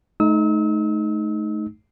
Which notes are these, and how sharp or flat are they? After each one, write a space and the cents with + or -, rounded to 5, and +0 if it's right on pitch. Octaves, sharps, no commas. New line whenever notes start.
A3 -30 D#4 +0 E6 -40